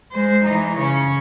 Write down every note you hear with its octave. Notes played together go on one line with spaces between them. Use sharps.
G#3 C5
E3 D#4
C#3 C#4